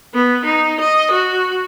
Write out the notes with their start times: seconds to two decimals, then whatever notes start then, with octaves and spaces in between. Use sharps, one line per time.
0.14 B3
0.45 D#4
0.80 D#5
1.11 F#4